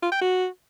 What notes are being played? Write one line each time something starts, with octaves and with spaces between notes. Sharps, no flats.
F4
G5
F#4